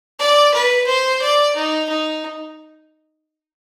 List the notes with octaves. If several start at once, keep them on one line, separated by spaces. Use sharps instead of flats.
D5
B4
C5
D5
D#4
D#4